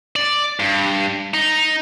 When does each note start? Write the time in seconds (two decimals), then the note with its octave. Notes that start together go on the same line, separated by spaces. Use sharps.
0.16 D5
0.60 G2
1.34 D#4